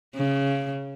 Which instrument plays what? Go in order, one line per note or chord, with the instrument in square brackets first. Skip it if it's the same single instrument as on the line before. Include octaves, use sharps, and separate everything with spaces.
[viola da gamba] C#3